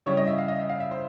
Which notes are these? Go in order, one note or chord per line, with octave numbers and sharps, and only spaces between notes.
C#3 E3 G3 C#5
D#5
E5
F5
D#5
E5
F5
E5
C5